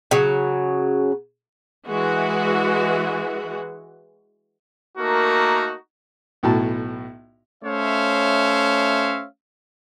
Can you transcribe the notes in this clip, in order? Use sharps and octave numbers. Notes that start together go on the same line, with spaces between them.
C#3 F#3
E3 G#3 F#4
A3 A#3 D#4 F#4 A#4
B1 A2 F#4 A5
A3 C#4 C5 C#5 E5 F5